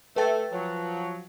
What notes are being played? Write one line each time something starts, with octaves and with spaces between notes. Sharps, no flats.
A3 B4 G5 A6
F3 F#3